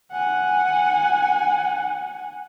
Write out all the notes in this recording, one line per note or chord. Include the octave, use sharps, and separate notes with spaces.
F#5 G#5